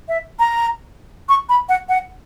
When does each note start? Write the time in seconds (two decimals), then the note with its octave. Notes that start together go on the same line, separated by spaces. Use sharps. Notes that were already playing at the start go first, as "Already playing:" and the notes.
0.08 E5
0.39 A#5
1.29 C#6
1.49 B5
1.69 F#5
1.89 F#5